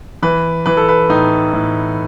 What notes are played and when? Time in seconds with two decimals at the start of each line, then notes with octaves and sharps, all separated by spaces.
0.23 E3 B4
0.66 E3 B4
0.77 A4
0.89 B4
1.09 A2 D#4
1.53 A2